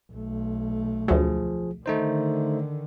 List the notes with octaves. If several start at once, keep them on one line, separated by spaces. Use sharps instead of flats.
B1 A3
D2 F3 F#3 G#4
D3 D#3 A3 D#4 C5